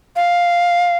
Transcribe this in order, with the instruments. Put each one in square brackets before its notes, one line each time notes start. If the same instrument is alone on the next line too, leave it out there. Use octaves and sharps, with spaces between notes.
[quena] F5